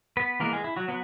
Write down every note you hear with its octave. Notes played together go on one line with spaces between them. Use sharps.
B3 B4
E3 G#3 A#3 B3 A#4
G#3 G#4
E4
F#3 F#4
F#3 B3